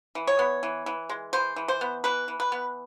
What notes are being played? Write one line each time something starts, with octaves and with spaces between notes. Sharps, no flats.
E3
C#5
B3
E3
E3
G#3
E3 C5
E3
C5
B3
E3 B4
E3
B4
B3